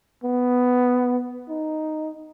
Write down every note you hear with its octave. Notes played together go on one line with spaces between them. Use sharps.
B3
D#4